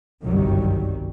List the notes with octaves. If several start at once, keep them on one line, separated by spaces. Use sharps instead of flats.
G1 C2 F#2 D#3 F#3 G3